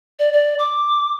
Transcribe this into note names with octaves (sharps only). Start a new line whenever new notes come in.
D5
D5
D6